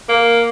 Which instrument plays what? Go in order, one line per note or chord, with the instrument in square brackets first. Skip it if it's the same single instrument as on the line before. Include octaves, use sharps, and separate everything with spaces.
[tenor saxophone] A#3